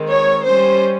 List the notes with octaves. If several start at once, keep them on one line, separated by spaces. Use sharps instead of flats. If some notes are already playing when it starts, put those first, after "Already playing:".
Already playing: D#3 G#3 C4
C#5
G3 C#4 C5